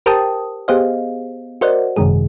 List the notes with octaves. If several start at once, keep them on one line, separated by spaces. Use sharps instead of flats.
G4 A#4 C5 G5 A5 D#6
B3 G4 G#4 C5 D#5 F5
F#4 A#4 C5 D5 D#5 F#5
G#1 F#2 C3 D#3 G#3 G#4